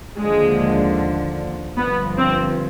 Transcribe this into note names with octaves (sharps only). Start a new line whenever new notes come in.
D#2 D3 F3 G#3
G1 G2 F3 B3
C4